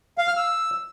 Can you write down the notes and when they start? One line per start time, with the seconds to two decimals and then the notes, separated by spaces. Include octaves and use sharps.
0.18 F5
0.27 F6
0.37 E6